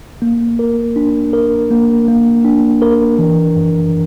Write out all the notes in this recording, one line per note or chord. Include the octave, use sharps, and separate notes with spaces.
A#3
A#4
D4
A#4
A#3
A#3
D4
A#4
E3
F#2